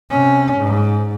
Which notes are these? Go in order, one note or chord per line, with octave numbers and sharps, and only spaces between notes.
C3 C#4
G#2